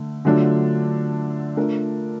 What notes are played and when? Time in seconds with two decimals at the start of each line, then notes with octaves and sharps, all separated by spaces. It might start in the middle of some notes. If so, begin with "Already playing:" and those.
Already playing: D3 A3
0.25 D3 F#3 A3 D4 F4
1.57 A3 D4 F4 A#4